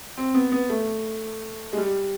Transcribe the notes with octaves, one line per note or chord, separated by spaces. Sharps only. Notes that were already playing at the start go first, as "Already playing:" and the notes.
C4
B3
B3
A3
G#3
G3